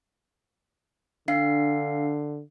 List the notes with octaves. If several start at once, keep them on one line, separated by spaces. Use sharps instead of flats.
D3 D4 F5 C7